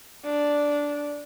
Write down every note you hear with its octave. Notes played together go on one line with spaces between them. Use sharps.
D4